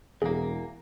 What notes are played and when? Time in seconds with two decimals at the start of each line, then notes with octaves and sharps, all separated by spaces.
0.22 E1 E2 A#3 G#4